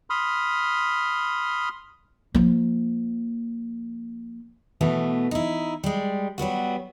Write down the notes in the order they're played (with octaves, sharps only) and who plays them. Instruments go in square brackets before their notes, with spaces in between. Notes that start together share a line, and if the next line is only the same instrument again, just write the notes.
[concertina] B5 C6 D#6 F6
[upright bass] F3 A#3
[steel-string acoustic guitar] B2 E3 A3 B3
D#4 E4
G3 G#3
F#3 G3 B3 F#4